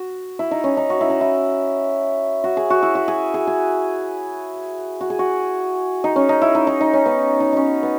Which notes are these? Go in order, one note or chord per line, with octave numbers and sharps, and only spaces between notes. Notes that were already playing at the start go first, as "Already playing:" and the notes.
Already playing: F#4
E4
D#4
C#4
D#4
F#4
E4
D#4
E4
F#4
G#4
F#4
E4
F#4
G#4
G#4
G#4
F#4
G#4
F#4
D#4
C#4
D#4
E4
D#4
D#4
D#4
C#4
B3
D#4
C#4 D#4
B3